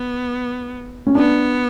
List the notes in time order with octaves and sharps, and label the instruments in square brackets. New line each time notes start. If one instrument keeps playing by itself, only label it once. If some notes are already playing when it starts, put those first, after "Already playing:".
Already playing: [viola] B3
[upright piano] C#4
[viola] B3 [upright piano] D4